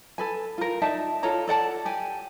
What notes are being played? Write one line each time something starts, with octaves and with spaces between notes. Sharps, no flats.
A4 B4 G#5
F4 A#4
D#4 D5 E5 A5
F4 A4 C#5 A#5
A4 D5 F#5 A5
G4 G#5